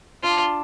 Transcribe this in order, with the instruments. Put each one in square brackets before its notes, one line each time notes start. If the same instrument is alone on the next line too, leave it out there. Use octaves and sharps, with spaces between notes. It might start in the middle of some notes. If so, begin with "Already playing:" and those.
[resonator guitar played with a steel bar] D4 [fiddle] F4